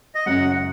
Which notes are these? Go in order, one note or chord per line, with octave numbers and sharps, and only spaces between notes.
D#5
F#1 F#2 F#3 C#4 F#4 F#5